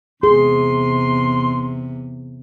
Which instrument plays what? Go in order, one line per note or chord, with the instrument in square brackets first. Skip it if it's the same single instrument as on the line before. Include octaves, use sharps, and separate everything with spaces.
[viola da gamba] E2 C3 [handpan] G#4 [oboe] C6